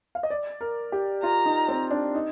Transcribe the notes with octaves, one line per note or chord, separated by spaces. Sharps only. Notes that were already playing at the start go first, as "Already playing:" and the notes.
F5
D#5
D5
A#4
G4
F4 A#5
D#4
C4
D4
D#4